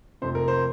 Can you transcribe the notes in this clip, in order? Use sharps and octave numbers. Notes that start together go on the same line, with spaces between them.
F1 F2 C3 C5
A#4
C5